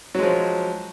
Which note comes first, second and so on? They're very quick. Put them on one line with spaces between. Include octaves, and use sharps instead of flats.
F#3 G#3 F3